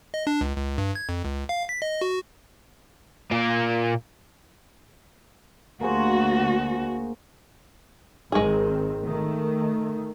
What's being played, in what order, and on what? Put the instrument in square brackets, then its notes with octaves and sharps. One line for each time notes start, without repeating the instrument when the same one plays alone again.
[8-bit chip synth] D#5
D4
C#2
C#2
G2
G#6
F2
C#2
F5
B6
D#5
F#4
[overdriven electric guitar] A#2 A#3
[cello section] D2 F#4 [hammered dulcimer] A#3 G#4 C5
[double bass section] G#1 D#3 C4 [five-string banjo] G#3 G#4
[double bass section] D#3 A3